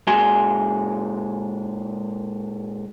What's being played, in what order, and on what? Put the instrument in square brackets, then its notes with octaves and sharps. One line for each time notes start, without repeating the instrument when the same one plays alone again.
[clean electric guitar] A#2 G#3 F#4 G#5 C6